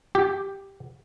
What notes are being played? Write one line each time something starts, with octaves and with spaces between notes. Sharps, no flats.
G4